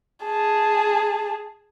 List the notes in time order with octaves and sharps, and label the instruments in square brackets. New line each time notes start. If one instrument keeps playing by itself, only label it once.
[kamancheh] G#4 A5